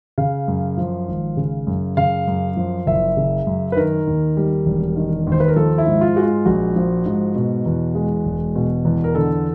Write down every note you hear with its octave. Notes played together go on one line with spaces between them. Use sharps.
C#3 F5
F#2
F3
G#1
C#3
F#2
C#3 F5
F#2
F3
F#1 E5
C#3
F#2
B4
D#3 A#4
D#2
G3
E1
D#3
D#2 C5
B4
A#4
F3 A4
E4
G#2
F4
G#3 F#4
F4
A#1 F#4
F3
G#2
B2
E2
G#3
E1
B2
E2
A#4
D3 A4